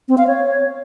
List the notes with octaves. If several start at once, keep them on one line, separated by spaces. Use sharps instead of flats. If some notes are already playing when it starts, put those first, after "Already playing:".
C4
F5
C#5